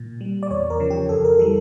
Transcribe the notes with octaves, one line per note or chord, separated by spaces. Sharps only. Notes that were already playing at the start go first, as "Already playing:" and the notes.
Already playing: A#2
G3
D5
E2 C#5
A#4
C#3 F3
G4
F2 A4
A#4
E3 G3 A4